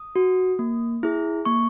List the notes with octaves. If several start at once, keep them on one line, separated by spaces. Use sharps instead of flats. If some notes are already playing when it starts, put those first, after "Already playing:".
Already playing: D#6
F#4
A#3
E4 G#4
A#3 C#6